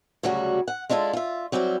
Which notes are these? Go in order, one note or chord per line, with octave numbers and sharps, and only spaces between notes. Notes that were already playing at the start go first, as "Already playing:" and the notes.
D2 C#3 F#3 G3 F#4
F#5
G#3 D4 E4 F4 A4
F4 E5
F#3 G3 C4 E4 G4